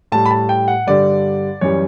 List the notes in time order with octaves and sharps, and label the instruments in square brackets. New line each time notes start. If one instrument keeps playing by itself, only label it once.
[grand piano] A2 G3 A5
B5
A5
G5
F#5
G2 D3 G3 D5
F#2 E3 G3 C#5